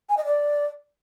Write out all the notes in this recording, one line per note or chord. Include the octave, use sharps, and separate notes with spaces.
G#5
D#5
D5